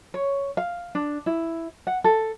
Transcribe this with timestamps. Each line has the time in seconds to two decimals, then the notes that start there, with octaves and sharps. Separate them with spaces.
0.14 C#5
0.57 F5
0.95 D4
1.26 E4
1.87 F#5
2.04 A4